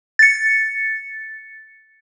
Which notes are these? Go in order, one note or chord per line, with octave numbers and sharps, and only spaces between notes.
A6 C#7